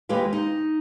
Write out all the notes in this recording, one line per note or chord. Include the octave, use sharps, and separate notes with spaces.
D#2 G#3 G4 B4 F5
D#4